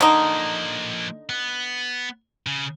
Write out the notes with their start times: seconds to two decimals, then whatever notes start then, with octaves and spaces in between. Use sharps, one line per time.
0.01 D3 F3 A#3 D#4
1.29 B3
2.47 C#3